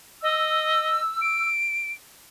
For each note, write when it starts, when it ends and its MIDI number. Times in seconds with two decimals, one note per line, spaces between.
0.23 1.00 75
0.23 1.49 88
1.22 1.93 98